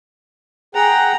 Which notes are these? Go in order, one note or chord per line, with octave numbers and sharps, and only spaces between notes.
G#4 F#5 G5 A#5